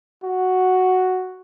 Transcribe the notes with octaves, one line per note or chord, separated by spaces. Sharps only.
F#4